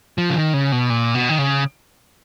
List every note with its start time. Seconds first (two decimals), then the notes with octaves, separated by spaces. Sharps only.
0.18 F3
0.30 C#3
0.36 D#3
0.54 C#3
0.72 B2
0.90 A#2
1.15 B2
1.29 D#3
1.39 C#3